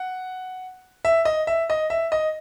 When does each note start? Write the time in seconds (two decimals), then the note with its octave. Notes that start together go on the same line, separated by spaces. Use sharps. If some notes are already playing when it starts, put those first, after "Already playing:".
Already playing: F#5
1.05 E5
1.25 D#5
1.47 E5
1.70 D#5
1.90 E5
2.12 D#5